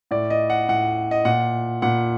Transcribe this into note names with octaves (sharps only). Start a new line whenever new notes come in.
A2 D5
D#5
F#5
A2 F#5
D#5
A#2 F#5
A#2 F#5